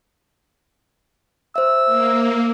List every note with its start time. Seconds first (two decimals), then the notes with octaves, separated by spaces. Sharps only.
1.56 C5 E5 E6
1.86 A#3